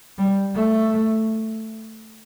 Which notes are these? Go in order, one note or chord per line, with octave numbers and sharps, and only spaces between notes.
G3
A3